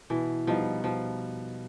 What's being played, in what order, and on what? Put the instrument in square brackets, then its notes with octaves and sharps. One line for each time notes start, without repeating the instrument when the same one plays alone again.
[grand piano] B2 [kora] E3
[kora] F3 [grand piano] G3 B3 D#4
[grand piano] B2 [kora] F3